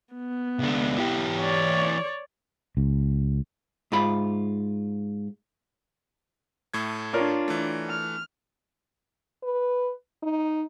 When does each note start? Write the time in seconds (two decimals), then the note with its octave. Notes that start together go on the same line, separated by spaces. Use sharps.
0.14 B3
0.59 C#2 D4
0.98 E3 G4
1.40 C#5 D5
2.77 C#2
3.92 G#2 F4 B5
6.74 A2 A3 G#6
7.13 D4 F4 A#4 C#5 D5
7.48 E3 A3
7.90 F6
9.43 B4
10.23 D#4